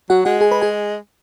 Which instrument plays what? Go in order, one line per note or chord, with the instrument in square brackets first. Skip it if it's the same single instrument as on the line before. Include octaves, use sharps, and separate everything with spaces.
[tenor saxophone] F#3 [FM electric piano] F#4 F#5
[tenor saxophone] G#3 [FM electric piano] F#4 F#5
[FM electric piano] G#4 G#5
B4 B5
G#4 G#5